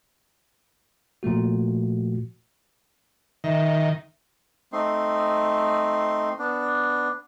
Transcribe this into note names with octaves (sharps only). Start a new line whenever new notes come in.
A#2 F3 A3 F#4
D#3 E5
A3 C4 D#4 C6
B3 D4